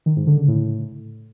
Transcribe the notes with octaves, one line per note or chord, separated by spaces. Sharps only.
D#3
G#2
D3
C#3
A2